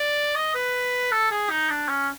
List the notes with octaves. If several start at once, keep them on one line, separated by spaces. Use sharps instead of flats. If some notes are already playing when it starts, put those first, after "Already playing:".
Already playing: D5
D#5
B4
A4
G#4
D#4
D4
C#4